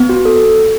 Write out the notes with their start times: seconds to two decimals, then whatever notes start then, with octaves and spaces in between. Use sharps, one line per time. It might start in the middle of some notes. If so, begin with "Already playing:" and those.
Already playing: B3
0.09 F#4
0.25 A4